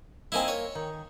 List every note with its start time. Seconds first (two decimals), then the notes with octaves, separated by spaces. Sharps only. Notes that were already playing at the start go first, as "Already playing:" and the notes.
0.32 A#3 C4 D#4 E4 A#4 G#5
0.48 C#5
0.75 D#3